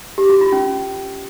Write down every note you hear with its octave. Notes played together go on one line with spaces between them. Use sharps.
G4
F#4
F4
C#4